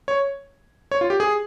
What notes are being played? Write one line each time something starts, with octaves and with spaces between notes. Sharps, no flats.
C#5
C#5
F4
G4
G#4